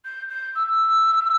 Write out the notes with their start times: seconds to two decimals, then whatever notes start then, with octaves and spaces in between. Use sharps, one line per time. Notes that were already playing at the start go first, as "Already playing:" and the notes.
0.05 G6
0.29 G6
0.55 E6